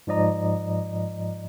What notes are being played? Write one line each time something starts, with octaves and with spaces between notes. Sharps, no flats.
G#2 F3 D5 D#5 A#5